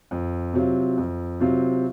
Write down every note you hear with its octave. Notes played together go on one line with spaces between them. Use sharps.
F2
C3 F#3 C4 F4
F2
C3 F#3 C4 F4